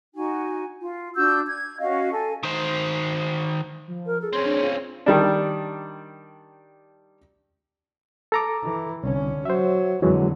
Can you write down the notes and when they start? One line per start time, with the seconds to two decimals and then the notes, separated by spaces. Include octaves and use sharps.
0.14 D#4 F#4 G#5
0.81 F4
1.15 D4 F#4 E6 G6
1.46 G#6
1.79 C#4 F#4 D#5 F5
2.12 A4 G#5
2.43 D#3 C5
3.88 F3
4.06 A#4
4.21 G#4 A4
4.33 C4 C#4 C#5 C6
4.46 D4
4.63 F4
5.06 D#3 G3 D4
8.32 A4 A#5 D6
8.63 E3
9.03 C2 D3 C#4
9.45 F#3 C5 E5
10.02 F2 D3 E3 F#3 G#3